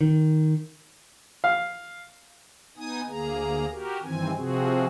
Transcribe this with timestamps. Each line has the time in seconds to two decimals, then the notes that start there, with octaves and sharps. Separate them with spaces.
0.01 D#3
1.44 F5
2.77 B3 D#4 G#5 D#6
3.08 D2 A#3 G#4 A#5
3.71 F#4 G4 A#4
4.02 G2 D#3 E3 C4 G#5
4.36 C3 F3 C4 F#4 G#4